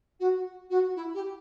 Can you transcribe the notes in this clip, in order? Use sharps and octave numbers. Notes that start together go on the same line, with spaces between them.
F#4
F#4
E4
G4